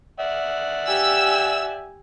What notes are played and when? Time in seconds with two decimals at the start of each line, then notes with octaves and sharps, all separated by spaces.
0.20 D5 E5 F#5
0.87 G4 G#5 E6